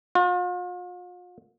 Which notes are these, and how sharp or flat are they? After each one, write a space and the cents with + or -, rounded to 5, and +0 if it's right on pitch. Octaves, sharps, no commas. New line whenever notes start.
F4 +45